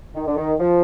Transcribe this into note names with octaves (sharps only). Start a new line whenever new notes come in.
D#3
D3
D#3
F3